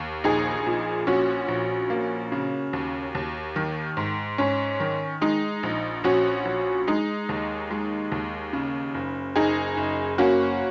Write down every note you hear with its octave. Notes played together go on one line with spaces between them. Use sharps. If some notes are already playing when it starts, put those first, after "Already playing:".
Already playing: D#2
A#1 D#4 G#4
A#2
A#1 C#4 F#4
A#1
A#3
C#3
D#2
D#2
D#3
G#2
G#2 C#4
D#3
G#3 D#4
A#1
A#1 C#4 F#4
A#1
G#3 D#4
D#2
G#3
D#2
C#3
F#1
F#1 D#4 G#4
F#1
A#3 C#4 F#4